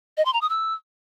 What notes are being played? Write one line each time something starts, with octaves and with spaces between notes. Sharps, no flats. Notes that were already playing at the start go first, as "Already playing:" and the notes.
D#5
C6
A#5
D#6
E6